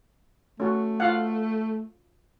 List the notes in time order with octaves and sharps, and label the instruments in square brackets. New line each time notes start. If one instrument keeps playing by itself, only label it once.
[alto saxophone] A3 [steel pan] C#4 F#4
[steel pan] F4 F5 F#5